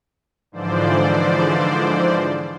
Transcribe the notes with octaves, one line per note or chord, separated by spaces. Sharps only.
G#2 D3 E3 F3 C5 D5